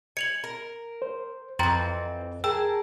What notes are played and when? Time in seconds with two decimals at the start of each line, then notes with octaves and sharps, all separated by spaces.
0.17 G#5 C#7 F7 F#7
0.44 A#4
1.02 C5
1.59 F2 E3 C4 G5 A#5 C6 A6
2.44 G#4 A#4 G5 A5 E6